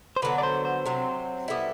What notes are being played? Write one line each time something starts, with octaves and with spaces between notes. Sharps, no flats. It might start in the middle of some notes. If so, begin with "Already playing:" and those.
C5
D3 F#3 B3 B4
D5
C5
C5
C3 F#3 C4
G3 B3 E4 A4